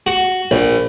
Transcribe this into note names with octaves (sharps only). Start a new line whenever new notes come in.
F#4
A#1